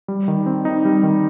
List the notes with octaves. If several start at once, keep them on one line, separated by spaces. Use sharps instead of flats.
G3
D#3
C4
D#4
G3
D#3